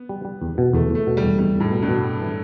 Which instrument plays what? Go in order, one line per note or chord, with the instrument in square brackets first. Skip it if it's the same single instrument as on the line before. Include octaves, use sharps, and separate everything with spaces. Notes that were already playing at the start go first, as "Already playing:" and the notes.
Already playing: [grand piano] B3
[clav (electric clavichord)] G3
G3
E2
B2
[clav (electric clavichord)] E2 [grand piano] A3
[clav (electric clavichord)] E2
[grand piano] A3
[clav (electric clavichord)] B2
[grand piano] G3
[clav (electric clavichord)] E2
[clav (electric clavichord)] E2 [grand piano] G3
[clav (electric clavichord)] E2
[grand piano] A2
[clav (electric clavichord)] B2
[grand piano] G2
[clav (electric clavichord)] B2
G3
E3